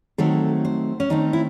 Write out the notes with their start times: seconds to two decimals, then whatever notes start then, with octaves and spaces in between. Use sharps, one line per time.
0.18 D#3 F#3 A3 C4 A4
0.65 C5
1.00 C#4
1.10 D#3 A3 C4 D#4
1.33 E4